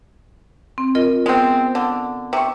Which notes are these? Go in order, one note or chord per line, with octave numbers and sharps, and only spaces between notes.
C4
F4 A#4 D#5
G#3 B3 C4
D3
C3 C#6